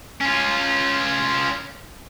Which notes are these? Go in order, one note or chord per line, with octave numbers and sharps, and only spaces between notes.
C#4 F4